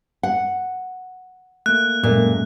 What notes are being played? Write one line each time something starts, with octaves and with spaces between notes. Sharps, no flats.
F#5
A3 A#3 F#6
F#2 A#2 G#3 A3